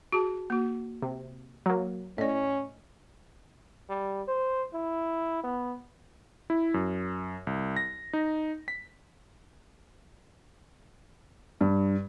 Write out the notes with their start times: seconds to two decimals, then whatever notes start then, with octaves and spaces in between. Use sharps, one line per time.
0.12 F#4 G#4 A5
0.50 A#3 F#4
1.02 C3
1.66 F#3 A#3
2.18 A2 C#4 D5 D#5
3.90 G3
4.28 C5
4.74 E4
5.43 B3
6.50 E4
6.74 F#2
7.47 C2
7.77 A#6
8.13 D#4
8.68 B6
11.61 G2